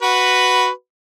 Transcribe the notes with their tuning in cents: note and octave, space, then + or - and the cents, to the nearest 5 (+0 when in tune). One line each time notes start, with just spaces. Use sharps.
F#4 +0 B4 +0